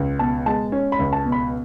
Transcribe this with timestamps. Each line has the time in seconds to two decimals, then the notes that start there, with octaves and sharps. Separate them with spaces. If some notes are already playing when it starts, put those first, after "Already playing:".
Already playing: C#2
0.19 B2 A5
0.46 G#3 A5
0.72 C#4
0.92 B5
0.99 C#2
1.13 A5
1.25 B2
1.32 B5